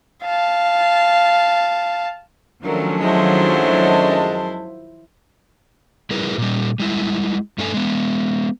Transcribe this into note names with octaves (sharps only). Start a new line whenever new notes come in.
F5 A5
D#3 F3 F#3 A3 C#4 D4 A4 A#4
F#2 G#3 E4 C5 A5
G3 E4 G#4 A#4 B4
A#2 G3
G3 G#3 E4
G2 A3 D4 A4 G#5
G#3 B3